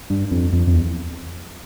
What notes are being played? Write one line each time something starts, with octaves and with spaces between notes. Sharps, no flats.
G2
F2
F2
F2
E2